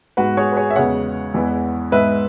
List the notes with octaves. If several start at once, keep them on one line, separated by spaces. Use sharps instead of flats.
G#2 G#3 B3 F#4 B4
G#4 C#5
B4
G#4 C#5
E5
E2 C#3 G#3 B3 C#5 F#5
E2 E3 G#3 B3
G#2 G#3 B3 B4 E5